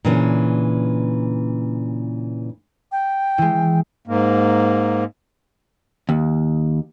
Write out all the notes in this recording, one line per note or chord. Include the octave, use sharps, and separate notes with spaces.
A#2 C#3 E3 B3 C#4 D4
G5
E3 G#3
G#2 A#3
D#2